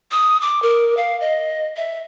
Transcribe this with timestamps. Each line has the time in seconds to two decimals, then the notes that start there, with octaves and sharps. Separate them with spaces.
0.11 D#6
0.42 D6
0.62 A#4
0.97 F5
1.21 D#5
1.77 E5